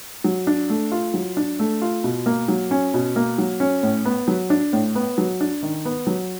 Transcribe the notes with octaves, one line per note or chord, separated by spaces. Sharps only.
F#3
D4
A3
F4
F#3
D4
A3
F4
B2
A#3
F#3
C#4
B2
A#3
F#3
C#4
A2
B3
F#3
D4
A2
B3
F#3
D4
D#3
B3
F#3